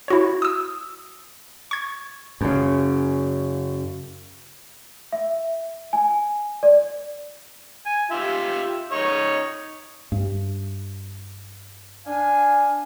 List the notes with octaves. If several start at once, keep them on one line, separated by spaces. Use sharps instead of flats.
E4 F#4 C#5
D#6 E6
C#6 G#6
F#2 C#3
E5
G#5
D5
G#5
F4 G4 E5
D#4 C#5 D#5
G2
D4 F5 G#5